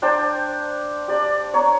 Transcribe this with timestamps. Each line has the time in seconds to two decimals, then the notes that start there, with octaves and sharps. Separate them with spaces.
0.02 D4 C5 G5 A5
1.08 G4 D5
1.54 C#5 A#5 C6 C#6